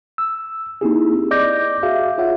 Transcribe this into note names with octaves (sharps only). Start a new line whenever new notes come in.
E6
A#3 C4 D#4 E4 G4 G#4
D5 D#5 D6 G6 A#6
F#4 G#4 E5 F5
F4 C#5 E5 F#5